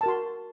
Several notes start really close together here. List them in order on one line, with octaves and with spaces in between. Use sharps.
A5 A#4 F#4 C6